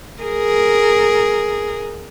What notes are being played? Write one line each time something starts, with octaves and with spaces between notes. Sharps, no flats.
G#4 A#4